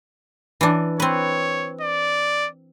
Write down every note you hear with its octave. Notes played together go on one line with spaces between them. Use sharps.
E3 D4
C4 B4 C#5
D5